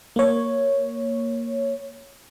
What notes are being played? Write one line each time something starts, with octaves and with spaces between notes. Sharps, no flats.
A#3 C#5